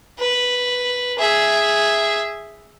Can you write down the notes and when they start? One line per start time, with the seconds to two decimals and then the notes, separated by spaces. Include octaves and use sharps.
0.19 B4
1.19 G#4 E5